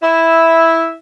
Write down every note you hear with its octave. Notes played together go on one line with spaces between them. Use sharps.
E4 E5